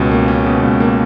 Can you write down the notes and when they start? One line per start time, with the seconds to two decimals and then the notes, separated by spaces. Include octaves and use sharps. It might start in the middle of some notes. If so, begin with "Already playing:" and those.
Already playing: C#2 B2 C#4
0.11 A#3
0.28 C#4
0.46 B2
0.63 C#2
0.80 A#3